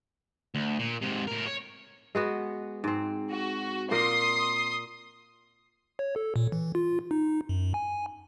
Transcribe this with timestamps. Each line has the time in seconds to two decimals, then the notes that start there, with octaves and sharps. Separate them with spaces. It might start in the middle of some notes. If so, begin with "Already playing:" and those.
0.55 D2
0.79 A#2
1.01 G#2 C3
1.28 A2 A#4
1.48 C#5
2.15 G#3 B3 F#4
2.84 G#2 C4
3.30 F#4
3.91 A#2 A#3 A#4 C6 D#6
5.99 C#5
6.16 A4
6.36 A#2
6.52 E3
6.75 F4
7.11 D#4
7.49 F#2
7.74 G#5